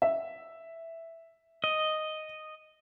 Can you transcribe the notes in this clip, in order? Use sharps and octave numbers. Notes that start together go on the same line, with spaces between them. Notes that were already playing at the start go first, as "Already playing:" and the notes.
E5
D#5